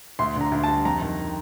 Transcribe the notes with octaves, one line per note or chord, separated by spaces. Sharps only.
D2 C6
D3 A#5
D2
G3 A5
F2 A#5
D#3